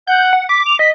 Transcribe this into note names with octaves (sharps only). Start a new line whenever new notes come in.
F#5 G6
F#5
D6 B6
F7
D#5 B6